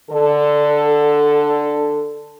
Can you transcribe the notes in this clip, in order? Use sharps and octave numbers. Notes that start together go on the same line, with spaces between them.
D3 A4